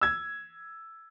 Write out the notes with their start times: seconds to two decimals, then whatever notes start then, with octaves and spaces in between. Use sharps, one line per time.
0.01 E6 G#6